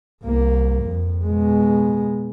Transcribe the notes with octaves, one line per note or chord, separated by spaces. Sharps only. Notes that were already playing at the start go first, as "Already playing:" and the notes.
C2 A#3
F2
B2 G#3